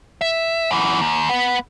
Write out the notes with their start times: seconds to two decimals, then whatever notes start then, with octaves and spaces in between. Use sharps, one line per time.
0.21 E5
0.71 F#2 E3
1.01 D#2
1.29 B3